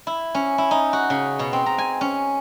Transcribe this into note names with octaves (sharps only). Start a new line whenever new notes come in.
E4
C#4
E4
D#4
F#4
C#3
B2
C4
A#5
G#5
C#4